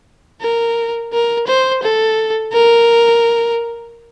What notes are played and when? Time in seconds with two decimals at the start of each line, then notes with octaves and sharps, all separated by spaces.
0.41 A#4
1.13 A#4
1.48 C5
1.83 A4
2.53 A#4